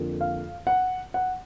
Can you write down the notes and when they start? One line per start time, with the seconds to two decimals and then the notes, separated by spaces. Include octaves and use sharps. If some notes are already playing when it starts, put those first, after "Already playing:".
Already playing: F2 D3 F3 A#3
0.21 F5
0.67 F#5
1.14 F#5